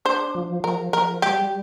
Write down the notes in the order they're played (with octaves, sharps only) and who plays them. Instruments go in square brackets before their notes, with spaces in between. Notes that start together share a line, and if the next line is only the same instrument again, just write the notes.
[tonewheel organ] D4 [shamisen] C5
[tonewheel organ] F3
[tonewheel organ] F3 [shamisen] A#4
[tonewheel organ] F3 [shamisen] A#4
[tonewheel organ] G3 [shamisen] G4